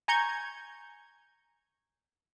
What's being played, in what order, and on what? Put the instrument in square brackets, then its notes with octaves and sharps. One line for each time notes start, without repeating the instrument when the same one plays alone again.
[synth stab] G#5 A#5 C#6 G6 G#6